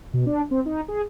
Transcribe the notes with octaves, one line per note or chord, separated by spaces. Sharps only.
B2
D4
C4
D#4
G#4